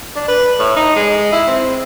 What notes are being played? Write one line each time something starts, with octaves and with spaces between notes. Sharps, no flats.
D4
B4
A2
D#4
G#3
E4
C4